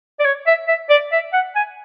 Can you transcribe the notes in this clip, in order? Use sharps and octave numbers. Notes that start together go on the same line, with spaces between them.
D5
C#5
E5
E5
D5
E5
F#5
G#5